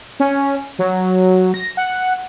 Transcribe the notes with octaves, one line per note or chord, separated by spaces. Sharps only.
C#4
F#3
A#6
F#5